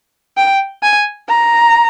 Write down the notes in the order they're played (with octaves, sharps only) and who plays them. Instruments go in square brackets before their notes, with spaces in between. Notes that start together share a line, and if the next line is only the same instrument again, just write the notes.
[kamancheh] G5
G#5
A#5